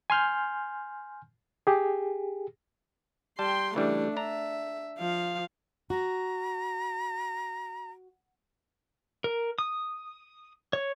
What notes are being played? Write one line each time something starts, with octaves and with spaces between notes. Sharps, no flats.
G#5 C6 F6 G6
G4 G#4
G3 G5 A5 C6
C#3 E3 G3 A3 D4
D4 E5 A#5
F3 F5
F#4 A#5
A#4
D#6
C#5